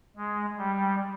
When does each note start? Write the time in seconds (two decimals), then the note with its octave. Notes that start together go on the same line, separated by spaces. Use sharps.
0.17 G#3
0.58 G3